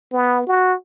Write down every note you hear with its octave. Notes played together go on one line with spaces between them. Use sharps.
B3
F#4